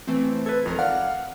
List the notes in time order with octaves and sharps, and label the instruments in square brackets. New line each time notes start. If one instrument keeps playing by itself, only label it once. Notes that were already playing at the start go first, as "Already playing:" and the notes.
[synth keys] E3 A3 C4
[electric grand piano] A4 B4 [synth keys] G#6
[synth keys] G#1 A#4 [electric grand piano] F2
[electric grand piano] D5 F5 F#5 [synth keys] F6